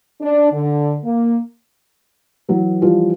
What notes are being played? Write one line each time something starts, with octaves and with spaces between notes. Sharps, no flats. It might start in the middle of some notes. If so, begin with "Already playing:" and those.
D4
D3
A#3
E3 F#3
E3 F3 G3 F4 G4